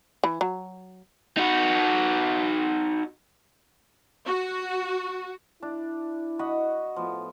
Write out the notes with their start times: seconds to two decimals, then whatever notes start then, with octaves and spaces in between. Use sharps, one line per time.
0.24 E3
0.41 F#3
1.37 D#4 F#4
4.26 F#4
5.62 D4 E4
6.39 F#4 D#5 B5
6.96 A2 F3 A3 B3 F4